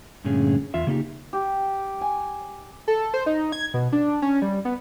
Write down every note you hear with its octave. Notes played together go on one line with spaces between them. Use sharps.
G2 A#2 D3 A3 C#4 G#4
E2 F4 E5
C#3 A#3 D#4 G4
G4
G#5
A4
C5
D#4
G#6
B2
D4
C#4
G3
B3